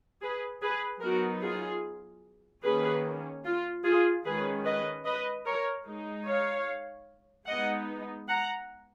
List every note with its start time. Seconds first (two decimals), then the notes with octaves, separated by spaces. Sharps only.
0.21 G#4 B4
0.62 G#4 B4
1.02 F#3 B3 D#4 F#4 A#4
1.42 F4 G#4
2.64 D#3 A#3 C#4 G#4 B4
3.45 F4
3.84 F4 G#4
4.25 D#3 G#3 C#4 G#4 B4
4.65 B4 D#5
5.05 B4 D#5
5.46 A#4 C#5
5.86 G#3 D#4
6.26 C#5 F5
7.47 G#3 B3 D#4 D#5 F#5
8.28 F#5 A#5